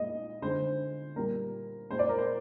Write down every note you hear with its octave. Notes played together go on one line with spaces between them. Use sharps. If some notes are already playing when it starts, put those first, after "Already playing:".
Already playing: A#2 G#3 D#5
D3 G#3 C5
A#2 G3 A#4
A#2 G#3 C5
D5
A#4
C5